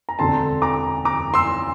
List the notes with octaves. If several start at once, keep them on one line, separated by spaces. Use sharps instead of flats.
A#5
E1 D2 D3 A3 C4 A5 C6
A#5 D6
A#5 D6
C6 E6